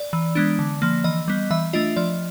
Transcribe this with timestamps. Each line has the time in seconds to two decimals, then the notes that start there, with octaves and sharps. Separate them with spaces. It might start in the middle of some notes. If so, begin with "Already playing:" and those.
Already playing: D5
0.13 E3
0.35 G#3 B3 D4
0.59 D3
0.82 F3 A#3
1.04 E3 D#5
1.28 G3 B3
1.51 E3 E5
1.73 A3 D4 F4 D#5
1.96 F3 D5